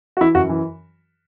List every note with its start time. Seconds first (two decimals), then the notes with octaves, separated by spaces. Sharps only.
0.17 F#4
0.21 E3 E4
0.35 F#2 F#4
0.49 E3